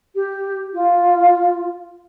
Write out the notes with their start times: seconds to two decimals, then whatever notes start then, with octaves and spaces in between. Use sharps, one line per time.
0.15 G4
0.74 F4